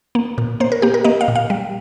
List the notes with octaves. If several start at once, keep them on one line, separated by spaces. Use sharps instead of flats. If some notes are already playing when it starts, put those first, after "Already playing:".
A#3
A#2
A#3 C5
A#4
A#3 G4
A#4
A#3 D#5
F5
A#2
F5
G3